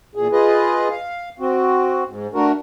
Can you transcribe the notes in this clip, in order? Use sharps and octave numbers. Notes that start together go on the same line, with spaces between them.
E2 A#2 G#4
F4 G#4 B4 D#5
F5
C4 F#4
G#2
A3 D4 F#4 A#4